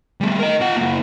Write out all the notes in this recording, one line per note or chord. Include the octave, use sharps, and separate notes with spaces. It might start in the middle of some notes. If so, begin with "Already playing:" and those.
G3 A3
A#4 D#5
F4 F#5
F#2 A#3